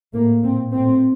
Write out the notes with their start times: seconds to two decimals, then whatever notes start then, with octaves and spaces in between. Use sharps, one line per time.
0.14 A2 A#3
0.44 A#2 C4
0.72 A2 C4